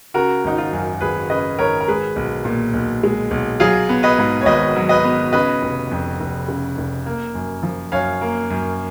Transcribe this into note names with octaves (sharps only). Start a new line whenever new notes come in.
C#3 F#4 A#4
G#1 D#4
F4
F#2
G#1 G#4 B4
C#3 B4 D#5
G#1 A#4 C#5
A#4
G#3 G#4 B4
B1
A#2
B1
G#3
B1
F#3 F4 G#4
B3
B4 D#5
G#2
C#5
G#1 B4 D#5
F#3
B4 D#5
B3
C#3 B4 D#5
F1
F2
F1
C#3
F1
A#3
F#2
F3
F#2 C#5 F5
A#3
F#2